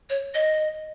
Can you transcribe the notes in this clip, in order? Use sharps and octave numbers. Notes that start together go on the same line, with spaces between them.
C#5
D#5